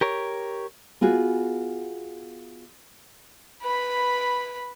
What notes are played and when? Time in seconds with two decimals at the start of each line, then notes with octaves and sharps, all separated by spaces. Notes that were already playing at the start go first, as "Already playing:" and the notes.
0.01 G4 A#4 C#5
1.01 B3 F4 F#4 G#4
3.62 B4 B5